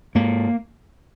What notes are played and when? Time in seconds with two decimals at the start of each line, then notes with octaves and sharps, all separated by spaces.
0.15 G#2 A#3